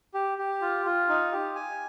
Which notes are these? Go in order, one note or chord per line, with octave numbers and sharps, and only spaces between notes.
G4
G4
F4
F4
D#4
G4
G#5